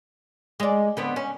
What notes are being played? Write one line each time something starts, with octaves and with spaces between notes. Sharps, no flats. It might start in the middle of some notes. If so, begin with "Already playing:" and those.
G#3 D5
D3 B3 C4
C#4